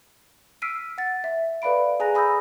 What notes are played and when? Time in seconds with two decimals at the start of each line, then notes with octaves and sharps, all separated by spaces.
0.62 E6 F6 B6 C7 D7 D#7
0.98 F#5 A6
1.24 E5
1.62 A4 B4 D5 F5 B5 D7
2.00 G#4 G#5 A#5 F#6 A#6
2.15 G#5 B5 D#6 E6 G6 A#6